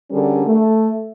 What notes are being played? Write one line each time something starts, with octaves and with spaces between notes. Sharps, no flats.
D3 G3 C#4 G#4 A#4
A3